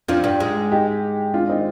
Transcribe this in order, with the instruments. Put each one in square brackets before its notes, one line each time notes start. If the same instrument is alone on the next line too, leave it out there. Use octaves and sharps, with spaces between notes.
[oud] F2 F3 [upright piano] D4 F4
[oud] G2 G3
G#2 G#3
[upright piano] D#4 G4
D4 F4
C4 D#4